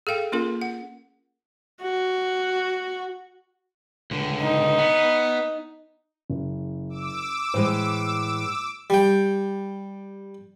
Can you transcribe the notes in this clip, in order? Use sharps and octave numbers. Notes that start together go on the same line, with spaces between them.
G#4 A4 F5 G5
A#3 C#4 F4 G#4 A#4
F#5
F#4
C#2 D3
D#4
B3
F#1
D6 E6
A2 E3 G#3 C5
G3 G5